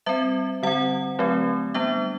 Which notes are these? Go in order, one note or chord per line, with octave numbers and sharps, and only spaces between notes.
G3 C4 E5
D3 G3 C4 F#5
D3 F#3 A3 C4
G3 B3 D4 E5